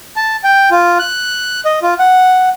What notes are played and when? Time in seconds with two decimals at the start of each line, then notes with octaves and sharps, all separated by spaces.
0.16 A5
0.44 G5
0.71 F4
0.99 F#6
1.65 D#5
1.82 F4
1.99 F#5